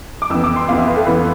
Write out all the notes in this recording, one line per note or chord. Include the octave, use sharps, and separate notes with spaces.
D6
F2 E3 B3 E6
D6
C6
F2 E3 B3 F5
E5
B4
A4
F2 E3 B3 B4